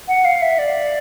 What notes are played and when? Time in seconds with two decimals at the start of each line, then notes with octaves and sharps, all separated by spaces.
0.08 F#5
0.25 F5
0.42 E5
0.59 D5